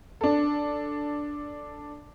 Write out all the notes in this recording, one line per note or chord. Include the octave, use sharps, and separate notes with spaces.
D4 A4